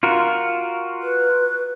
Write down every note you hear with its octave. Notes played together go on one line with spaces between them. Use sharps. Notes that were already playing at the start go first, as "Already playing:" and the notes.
F4 F#4 A#4
B4